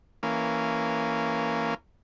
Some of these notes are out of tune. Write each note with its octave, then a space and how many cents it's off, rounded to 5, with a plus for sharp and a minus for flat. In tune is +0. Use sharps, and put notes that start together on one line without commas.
E3 -10 A#3 -15 C#4 +0